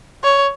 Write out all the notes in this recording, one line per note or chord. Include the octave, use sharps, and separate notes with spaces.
C#5